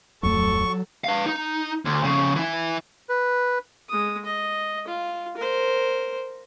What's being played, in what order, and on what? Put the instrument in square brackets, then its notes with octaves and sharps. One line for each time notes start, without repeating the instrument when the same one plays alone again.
[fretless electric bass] D1 F2 A3 [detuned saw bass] F#3 [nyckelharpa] A4 [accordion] C#6
[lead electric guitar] B4 F5
D#4
D2
F2 C#3
E3 E4
[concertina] B4
[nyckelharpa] G#3 D#6
D#5
F4
A#4 C5